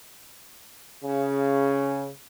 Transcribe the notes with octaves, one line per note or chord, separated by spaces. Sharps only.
C#3